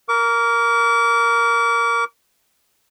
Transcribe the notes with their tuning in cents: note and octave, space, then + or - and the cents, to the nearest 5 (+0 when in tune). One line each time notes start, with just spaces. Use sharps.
A#4 +0 D6 -40